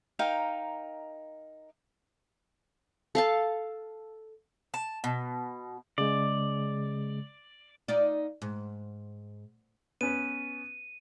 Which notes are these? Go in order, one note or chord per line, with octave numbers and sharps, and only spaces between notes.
D#4 A#4 F5 G5
A4 F5 A5
A5
B2
C#3 G#3 D5
D#4 F4 D5
G#2
B3 C#4 B4 D#7